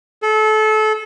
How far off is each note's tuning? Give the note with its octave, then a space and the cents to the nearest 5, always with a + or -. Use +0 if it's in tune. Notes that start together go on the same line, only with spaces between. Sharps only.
A4 -30